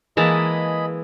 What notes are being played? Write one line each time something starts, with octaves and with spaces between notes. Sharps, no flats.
E3 G#3 A#3 G#4 D#5 A5 B5